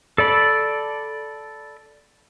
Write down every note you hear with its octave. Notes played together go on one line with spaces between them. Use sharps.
A4 D5 B5